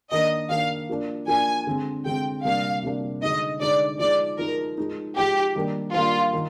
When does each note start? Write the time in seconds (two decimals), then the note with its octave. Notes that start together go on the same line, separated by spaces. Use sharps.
0.11 D#3 A#3 D4 D#5
0.50 D#3 A#3 D4 F5
0.89 F3 A#3 D4
1.28 F3 A#3 D4 G#5
1.67 D3 G#3 C4
2.06 D3 G#3 C4 G5
2.45 C3 G3 A#3 D4 F5
2.83 C3 G3 A#3 D4
3.22 D3 G#3 D#4 D#5
3.61 D3 G#3 D#4 D5
4.00 F3 G#3 D#4 D5
4.39 F3 G#3 D#4 A#4
4.78 F3 G#3 D#4
5.17 F3 G#3 D#4 G4
5.55 D#3 G3 A#3 D4
5.94 D#3 G3 A#3 D4 F4
6.33 D#3